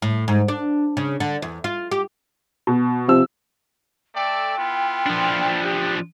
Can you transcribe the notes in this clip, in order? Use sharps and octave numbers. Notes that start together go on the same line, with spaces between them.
A2
G#2
D4
C#3
D3
E2
F4
G4
B2
C3 F3 E6
A3 A4 D5 G5
B3 E4 F4
F3 D4
G4